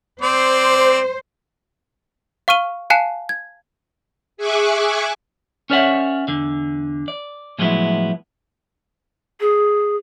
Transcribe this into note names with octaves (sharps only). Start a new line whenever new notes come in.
C4 C5 D5
F5 C#6 F6 D#7 G7
F5 G#5 A5 F#6 C7 E7
G#6
G#4 E5 G#5 C#6 D6 F#6
C#4 A#4 C#5 D5 E5 F#5
E2 D3
D5
A2 F3 F#3 G#3 B3 E4
G#4